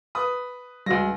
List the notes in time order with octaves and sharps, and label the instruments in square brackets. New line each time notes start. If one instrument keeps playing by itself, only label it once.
[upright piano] B4 D#6
[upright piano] C#2 A#6 [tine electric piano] G3 F#4